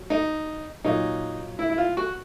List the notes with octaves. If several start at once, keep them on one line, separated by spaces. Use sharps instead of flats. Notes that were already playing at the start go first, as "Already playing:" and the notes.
Already playing: F#3
D#4
A#2 F#3 D#4
E4
E4
F4
F#4